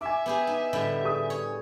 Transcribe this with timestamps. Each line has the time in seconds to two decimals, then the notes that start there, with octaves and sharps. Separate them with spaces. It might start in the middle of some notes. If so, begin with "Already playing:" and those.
0.01 E5 G#5 D6
0.26 B3 G4 G#4
0.47 D#4
0.73 A2 D3 G3
1.04 G#4 D#6
1.30 C#5